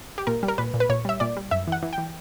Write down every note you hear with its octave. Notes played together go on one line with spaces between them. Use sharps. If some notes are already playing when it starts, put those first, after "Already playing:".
G4
A#2 A#4
G3
A#4
A#2 B4
A#2
B4
A#2 C#5
G3 E5
A#2 D5
G3
F#2 E5
E3 F#5
E3
G5
E3